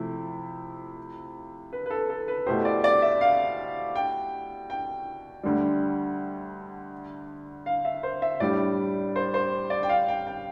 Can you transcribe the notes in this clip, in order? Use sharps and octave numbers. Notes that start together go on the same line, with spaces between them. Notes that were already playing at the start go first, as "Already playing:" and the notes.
Already playing: C3 F3 A3 E4
B4
B4
A4
A4
B4
B2 A3 E4 G4 C5
D5
D5
E5
F5
G5
G5
D2 D3 G3
F5
E5
C5
E5
A2 G3 D4 G4 D5
C5
C5
D5
G5
F5
G5
G5